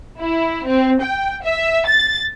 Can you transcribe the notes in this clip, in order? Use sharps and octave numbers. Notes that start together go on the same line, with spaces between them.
E4
C4
G5
E5
A6